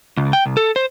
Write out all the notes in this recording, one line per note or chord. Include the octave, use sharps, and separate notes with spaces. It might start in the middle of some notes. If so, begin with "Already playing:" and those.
C#2
G5
C2
A4
C5